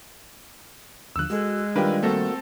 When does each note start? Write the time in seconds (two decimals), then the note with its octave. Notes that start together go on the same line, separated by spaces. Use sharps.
1.16 D#2 D3 F3 E6 F#6
1.30 G#3 F#4 A4
1.76 D#3 G3 D4 F4 G4 A#4 B4
2.03 A3 A#3 C4 F#4 A4